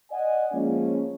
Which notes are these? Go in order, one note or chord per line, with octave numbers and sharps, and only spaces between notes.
D5 D#5 F#5 G#5
F3 G#3 A#3 C#4